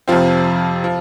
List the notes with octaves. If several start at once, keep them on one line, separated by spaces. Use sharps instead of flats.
F2 C3 F3 C4 F4
F3